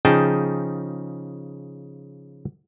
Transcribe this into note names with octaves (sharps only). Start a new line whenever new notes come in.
C#3 F3 D#4 G#4 G5 A5